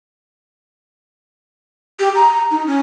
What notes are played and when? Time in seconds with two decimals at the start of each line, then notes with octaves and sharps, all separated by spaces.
1.99 G4
2.15 A#5
2.51 D#4
2.66 C#4